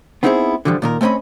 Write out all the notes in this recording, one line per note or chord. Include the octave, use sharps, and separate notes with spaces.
B3 C4 D#4 E4 G4 G#4
D3 E3 F3 G3
A#2 D#3 A#4
A3 C4 C#4 D#5 B5